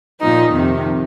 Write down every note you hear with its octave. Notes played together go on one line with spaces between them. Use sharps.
A#2 F3 D#4
F2 C3 D#3